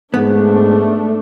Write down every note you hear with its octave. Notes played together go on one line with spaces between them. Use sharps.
G#2 A3 B3 D4